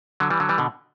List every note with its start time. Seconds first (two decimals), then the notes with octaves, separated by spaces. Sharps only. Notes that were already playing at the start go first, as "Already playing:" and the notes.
0.20 D3 F#3
0.30 E3 G3
0.40 D3 F#3
0.49 E3 G3
0.58 B2 D3